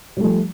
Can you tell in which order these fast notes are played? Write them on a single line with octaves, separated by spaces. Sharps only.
G3 A3 F3